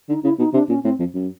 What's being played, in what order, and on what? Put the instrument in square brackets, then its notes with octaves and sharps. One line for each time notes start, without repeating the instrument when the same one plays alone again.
[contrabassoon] D3 [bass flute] D#4
[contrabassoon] C#3 [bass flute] E4
[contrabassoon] B2 [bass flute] D#4
[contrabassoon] C3 [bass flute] D4
[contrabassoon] A#2 [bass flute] C#4
[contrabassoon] A2 [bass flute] C4
[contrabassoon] F2
F#2